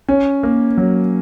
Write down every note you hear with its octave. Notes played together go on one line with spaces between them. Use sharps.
C#4
A#3
F#3